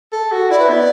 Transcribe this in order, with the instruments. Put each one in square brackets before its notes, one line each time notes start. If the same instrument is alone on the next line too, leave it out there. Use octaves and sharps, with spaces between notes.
[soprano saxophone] A4
F#4
[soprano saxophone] E4 [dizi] D5
[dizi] B4
[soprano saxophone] B3 [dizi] D5 E5